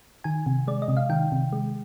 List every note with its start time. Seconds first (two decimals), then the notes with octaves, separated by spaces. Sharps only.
0.24 D#3 G#5
0.46 C3
0.67 G#3 D5
0.82 D#5
0.88 C3
0.97 F5
1.10 D#3 G5
1.32 C3
1.53 G#3